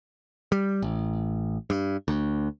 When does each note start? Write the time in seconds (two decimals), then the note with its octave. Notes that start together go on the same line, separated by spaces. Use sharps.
0.52 G3
0.82 A1
1.70 G2
2.08 D2